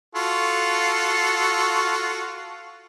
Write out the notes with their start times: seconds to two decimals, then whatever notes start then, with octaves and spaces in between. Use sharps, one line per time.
0.15 F4 F#4 A4